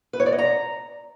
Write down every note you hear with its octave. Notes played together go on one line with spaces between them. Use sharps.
B4
C#5
D5
D#5
A#5